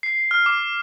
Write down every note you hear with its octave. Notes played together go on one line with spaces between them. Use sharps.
C7
F6
D6